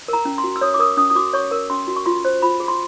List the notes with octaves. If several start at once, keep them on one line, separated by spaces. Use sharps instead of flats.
A#4 A#5
C#4
C6
F#4
E6
C#5 D#6
D6
A#4 D#6
C#4 D#6
D#6
F#4 D6
C#5 C#6
A#4
C#4 C6
F#4
C#6
F4 C6
C5
F4 B5
G#4
C6